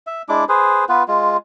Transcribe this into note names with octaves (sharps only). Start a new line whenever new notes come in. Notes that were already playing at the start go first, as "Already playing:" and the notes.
E5
G#3 D4 E4 D6
G#4 B4 C5
B3 F4 B4
G#3 F4